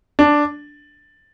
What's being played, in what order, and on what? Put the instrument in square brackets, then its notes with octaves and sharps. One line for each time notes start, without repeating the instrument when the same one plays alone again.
[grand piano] D4